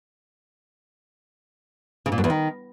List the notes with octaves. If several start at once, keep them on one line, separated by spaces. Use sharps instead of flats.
C#3
A#2
F#2
E2
D#3